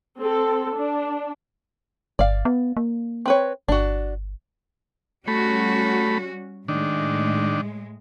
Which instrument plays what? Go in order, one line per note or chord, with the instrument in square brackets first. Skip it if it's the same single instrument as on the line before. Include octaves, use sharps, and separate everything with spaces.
[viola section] C4 A4
D4
[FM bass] G1 [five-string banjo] D5 F5
[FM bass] B3
A#3
[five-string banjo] C4 B4 C#5
[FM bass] G1 [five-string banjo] D4 F#4
[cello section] G3 C#4 F#4 [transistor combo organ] A3 B5
[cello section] A2 G#3 [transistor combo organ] D#3 D4